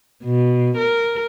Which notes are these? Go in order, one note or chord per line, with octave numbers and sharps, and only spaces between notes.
B2
A#4